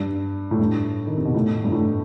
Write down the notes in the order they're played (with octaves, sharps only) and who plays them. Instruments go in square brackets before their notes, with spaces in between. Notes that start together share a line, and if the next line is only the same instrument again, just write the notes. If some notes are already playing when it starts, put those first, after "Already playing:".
Already playing: [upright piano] G2
A2
G2
D#3
C3
B2
A2
G2
A2